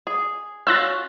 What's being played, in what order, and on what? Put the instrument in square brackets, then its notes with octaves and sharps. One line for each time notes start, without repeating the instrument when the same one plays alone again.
[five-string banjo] G#4
[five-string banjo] C#4 F4 F#4 [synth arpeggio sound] E6 F#6 A6